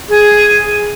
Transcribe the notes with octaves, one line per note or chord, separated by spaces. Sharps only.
G#4